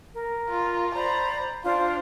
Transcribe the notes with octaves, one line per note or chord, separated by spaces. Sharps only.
A#4
F4
C5 D5 A#5 B5
D4 F4 C5 F5